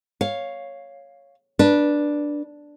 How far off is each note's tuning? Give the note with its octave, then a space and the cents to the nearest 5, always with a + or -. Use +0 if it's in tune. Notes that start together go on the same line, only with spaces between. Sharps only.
C#5 +0 F5 +0
D4 +0 B4 -20